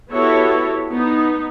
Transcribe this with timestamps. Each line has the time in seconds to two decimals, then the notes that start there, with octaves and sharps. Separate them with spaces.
0.12 B3 E4 F#4 G4 A4 C#5
0.91 B3 D#4